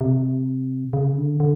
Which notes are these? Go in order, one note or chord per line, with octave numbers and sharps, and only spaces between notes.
C3
C#3
D3
D3